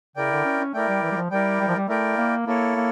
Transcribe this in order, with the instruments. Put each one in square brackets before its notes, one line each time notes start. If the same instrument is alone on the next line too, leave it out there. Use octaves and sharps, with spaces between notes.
[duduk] C#3 [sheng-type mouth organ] E4 A#4 D5 G5
[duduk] D3
C#4
C#4
[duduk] A3 [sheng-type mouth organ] E4 A#4 D5 G5
[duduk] G3
E3
G3
F3
[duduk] G3 [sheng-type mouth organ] E4 A#4 D5 G5
[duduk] G3
F3
G3
[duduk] A3 [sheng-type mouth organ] E4 A#4 D5 G5
[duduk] A#3
[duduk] A#3 [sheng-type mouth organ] E4 A4 C#5
[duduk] A#3